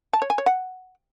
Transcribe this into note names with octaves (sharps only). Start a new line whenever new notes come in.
A5
C#5
G#5
C#5
F#5